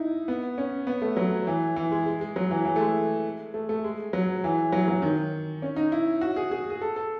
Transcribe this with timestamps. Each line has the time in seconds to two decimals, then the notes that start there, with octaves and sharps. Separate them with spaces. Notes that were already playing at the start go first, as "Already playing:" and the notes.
Already playing: D#4 E4
0.28 B3
0.58 C#4
0.87 B3
1.02 A3
1.17 F#3
1.47 E3
1.76 E3
1.91 G#3
2.06 G#3
2.21 G#3
2.36 F#3
2.51 E3
2.65 E3
2.76 A3
2.81 G#3
3.54 A3
3.69 A3
3.84 G#3
4.13 F#3
4.44 E3
4.73 F#3
4.88 F#3
5.02 D#3
5.62 C#4
5.76 D#4
5.92 E4
6.21 F#4
6.36 G#4
6.51 G#4
6.70 G#4
6.81 A4
6.96 A4